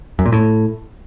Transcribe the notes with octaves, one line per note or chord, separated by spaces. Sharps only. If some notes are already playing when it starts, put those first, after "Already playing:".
F#2
A#2
A2